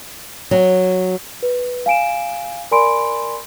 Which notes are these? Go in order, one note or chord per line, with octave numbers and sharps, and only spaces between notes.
F#3
B4
F5 G#5 D7 E7
A#4 D5 G#5 B5 C6 D7